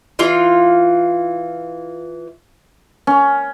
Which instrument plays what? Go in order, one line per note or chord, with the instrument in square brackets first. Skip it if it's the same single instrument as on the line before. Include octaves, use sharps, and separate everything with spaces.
[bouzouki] E3 F4 F5
[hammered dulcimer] C#4